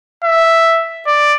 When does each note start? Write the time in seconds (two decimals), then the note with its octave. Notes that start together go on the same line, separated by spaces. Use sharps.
0.24 E5
1.07 D5